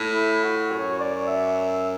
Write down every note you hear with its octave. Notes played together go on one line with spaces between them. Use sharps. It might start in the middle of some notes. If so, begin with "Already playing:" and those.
Already playing: A2
E4
F#4
F#2 C#5
D5
E5